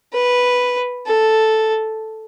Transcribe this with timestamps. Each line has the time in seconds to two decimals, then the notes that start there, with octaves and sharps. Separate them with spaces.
0.13 B4
1.07 A4